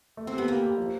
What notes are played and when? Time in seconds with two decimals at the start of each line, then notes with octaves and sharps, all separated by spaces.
0.17 A3
0.27 C4
0.33 B3 G4
0.48 A#3 G4
0.62 G4
0.78 F3